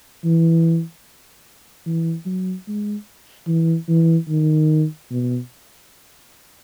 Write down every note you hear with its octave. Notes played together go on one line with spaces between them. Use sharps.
E3
E3
F#3
G#3
E3
E3
D#3
B2